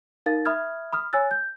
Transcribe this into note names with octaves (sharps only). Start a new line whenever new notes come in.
D#4 A#4 F5 A6
E5 B5 D#6 F6 G#6
B5 D#6 F6
C#5 G#5 E6 F#6 A6
G6